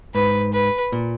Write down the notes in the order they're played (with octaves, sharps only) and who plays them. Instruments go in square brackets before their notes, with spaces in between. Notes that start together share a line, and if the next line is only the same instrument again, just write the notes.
[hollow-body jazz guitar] G#2 [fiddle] B4
[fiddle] B4
[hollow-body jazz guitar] A#2